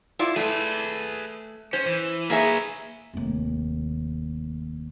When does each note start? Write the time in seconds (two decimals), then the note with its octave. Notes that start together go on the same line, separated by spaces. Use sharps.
0.19 E4 F4 D5
0.36 A3 G#4 B4
1.73 C#4 C5
1.85 E3
2.30 A#3 G#4 B4 C#5 E5
3.14 F1 D#2